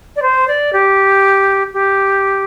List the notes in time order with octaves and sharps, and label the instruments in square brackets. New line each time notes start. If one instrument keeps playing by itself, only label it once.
[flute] D5
C5
D5
G4
G4